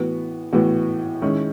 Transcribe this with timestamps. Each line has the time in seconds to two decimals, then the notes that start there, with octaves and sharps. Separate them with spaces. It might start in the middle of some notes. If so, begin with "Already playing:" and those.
Already playing: A2 E3 B3 F#4
0.53 A2 E3 B3 F#4
1.22 D#3 G#3 C#4 E4